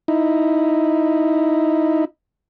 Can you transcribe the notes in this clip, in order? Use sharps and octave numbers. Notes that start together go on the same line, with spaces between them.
D#4 E4